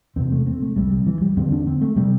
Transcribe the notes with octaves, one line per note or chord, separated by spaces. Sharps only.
E2 C3 C4
A3
C4
A3
C2 C3 G3
G3
E3
G3
E2 D3 C4
D4
C4
A3
C3 G3